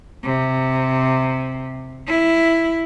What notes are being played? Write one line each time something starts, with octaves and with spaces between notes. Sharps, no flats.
C3
E4